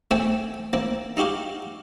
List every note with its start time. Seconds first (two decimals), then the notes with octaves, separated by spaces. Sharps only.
0.11 A3 C4 E4 G5 G#5
0.73 A#3 C4 E4
1.17 D#4 E4 F#4 G4 F5